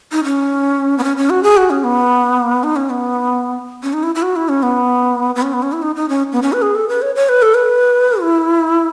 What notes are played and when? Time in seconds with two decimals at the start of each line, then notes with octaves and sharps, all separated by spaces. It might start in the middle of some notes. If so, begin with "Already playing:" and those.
0.12 D#4
0.24 C#4
0.98 B3
1.03 C#4
1.17 C#4
1.30 F#4
1.43 G#4
1.57 F#4
1.70 C#4
1.84 B3
2.63 D#4
2.76 C#4
2.90 B3
3.83 C#4
3.93 D#4
4.03 E4
4.15 E4
4.22 F#4
4.36 E4
4.49 C#4
4.63 B3
5.35 B3
5.42 C#4
5.53 B3
5.62 C#4
5.72 E4
5.82 D#4
5.96 D#4
6.09 C#4
6.32 B3
6.42 C#4
6.53 B4
6.62 G#4
6.75 A4
6.89 B4
7.02 C#5
7.15 C#5
7.29 B4
7.42 A4
7.54 B4
8.22 E4